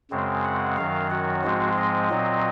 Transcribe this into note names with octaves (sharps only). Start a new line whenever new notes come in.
F#2 C#3 G#3 C4
F#5
F#2 D#3 F#3 F5
F#4
G#2 F3 G#3 C4
D#5
A#2 F#3 C4